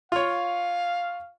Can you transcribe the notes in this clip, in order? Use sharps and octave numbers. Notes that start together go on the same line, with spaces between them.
F4 C#5 F5